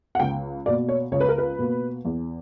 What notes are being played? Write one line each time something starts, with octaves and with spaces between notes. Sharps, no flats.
F#5
C#2 G5
B2 A#3 D5
C#5
C#2 C#5
B4
A#4
B4
B2 A#3
E2